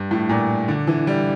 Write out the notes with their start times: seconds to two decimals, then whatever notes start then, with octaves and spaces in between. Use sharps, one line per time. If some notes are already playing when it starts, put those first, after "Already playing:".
Already playing: G2
0.11 A2
0.29 A#2
0.68 D3
0.87 E3
1.07 G3